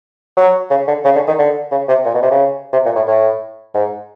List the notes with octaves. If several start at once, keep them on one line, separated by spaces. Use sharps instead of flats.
F#3
C#3
D3
C#3
D3
D#3
D3
C#3
C3
A#2
B2
C3
C#3
C3
A#2
A2
A2
G#2